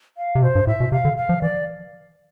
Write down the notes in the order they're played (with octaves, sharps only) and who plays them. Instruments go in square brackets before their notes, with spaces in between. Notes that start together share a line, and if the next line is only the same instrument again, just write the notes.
[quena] F5
[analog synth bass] C3
[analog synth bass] B2 [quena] C5
[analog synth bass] G2
[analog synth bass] A2 [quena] E5
[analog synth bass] B2
[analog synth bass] C3 [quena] F5
[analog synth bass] D3
[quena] F5
[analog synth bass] F3
[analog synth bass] E3 [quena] D5